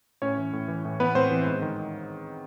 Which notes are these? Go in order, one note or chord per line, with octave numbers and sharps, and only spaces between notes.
A2 C#4 C#5
E3
A2
E3
A2
E3 B3 B4
A2 C4 C5
E3
G#2
D#3